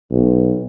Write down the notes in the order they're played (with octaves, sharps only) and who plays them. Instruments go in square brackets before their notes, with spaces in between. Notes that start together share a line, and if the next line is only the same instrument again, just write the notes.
[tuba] B1